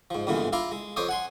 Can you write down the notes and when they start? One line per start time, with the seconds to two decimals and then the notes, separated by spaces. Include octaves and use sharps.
0.10 G#2 F3
0.27 E2 G2 A#2 D3 E3 G#3
0.53 E4 F4 F5 A#5 D6
0.72 G#3
0.96 F2 C5 C#5 D6 D#6
1.09 F#5 G#5 C6